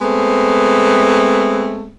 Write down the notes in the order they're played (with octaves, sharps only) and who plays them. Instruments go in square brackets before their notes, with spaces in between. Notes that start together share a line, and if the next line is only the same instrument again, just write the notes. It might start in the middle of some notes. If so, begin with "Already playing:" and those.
[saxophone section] G#3 A3 B3 C4